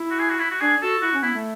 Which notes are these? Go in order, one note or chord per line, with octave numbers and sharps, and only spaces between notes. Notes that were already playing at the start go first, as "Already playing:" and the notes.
Already playing: E4
F#4
G#4
F#4
E4
F#4
D4 G#4
F#4 A4
E4 F#4
C#4
B3 E4
A3